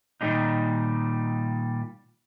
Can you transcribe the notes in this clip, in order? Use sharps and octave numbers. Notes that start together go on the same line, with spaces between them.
A#2 D#3 G3 G#3 D4 D#4